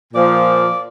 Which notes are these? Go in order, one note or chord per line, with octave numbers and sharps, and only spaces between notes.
A#2 F3 D5